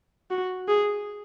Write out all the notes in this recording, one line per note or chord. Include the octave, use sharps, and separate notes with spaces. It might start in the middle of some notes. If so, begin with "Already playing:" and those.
F#4
G#4